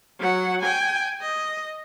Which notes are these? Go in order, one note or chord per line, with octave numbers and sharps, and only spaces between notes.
F#3 F#5
G5 G#5
D#5